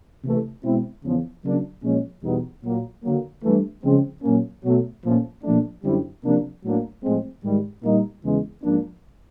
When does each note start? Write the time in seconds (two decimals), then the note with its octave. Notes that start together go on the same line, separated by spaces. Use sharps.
0.24 C3 E3 A3
0.64 B2 G#3 C4 E4
1.04 E2 C#3 F3
1.44 C#3 F#3 A#3 D4
1.84 A#2 F3 G#3 C#4
2.24 E2 B2 G3 B3 D#4
2.64 A#2 F#3 A#3
3.04 D3 F#3 A#3
3.43 G2 E3 A3
3.84 C#3 F3 G#3 C4
4.23 A#2 F#3 A#3 C#4
4.64 B2 F#3 A3
5.04 A#2 F3 A3 C#4
5.44 A#2 F3 A3 D4
5.84 F#2 D3 G3 C4 E4
6.24 C3 F3 A#3 D4
6.64 A2 F#3 A#3 D4
7.04 A2 F3 G#3 C4
7.44 G#2 D#3 G3
7.84 A#2 G3 A#3 D#4
8.24 E2 C#3 E3 G#3
8.63 G#2 F3 A#3 D4